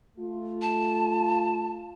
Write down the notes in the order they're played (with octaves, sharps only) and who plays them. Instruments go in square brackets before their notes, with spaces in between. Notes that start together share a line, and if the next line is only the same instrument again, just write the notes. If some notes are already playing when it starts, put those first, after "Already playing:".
[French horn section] A3 F4
[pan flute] A5